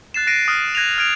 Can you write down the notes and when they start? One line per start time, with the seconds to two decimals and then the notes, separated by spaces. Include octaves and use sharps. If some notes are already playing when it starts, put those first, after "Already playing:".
0.14 F#6 A6 C7 E7
0.27 F#6 A#6 C7 D7 D#7
0.48 D#6 F6 F#6 D#7
0.75 F#6 G#6 A#6 D#7 F7
0.98 F6 G#6 D7 F7